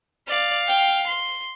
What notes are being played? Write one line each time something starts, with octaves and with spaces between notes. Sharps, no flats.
D5 F5
G5
C6